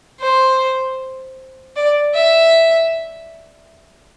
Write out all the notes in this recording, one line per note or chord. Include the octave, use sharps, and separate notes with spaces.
C5
D5
E5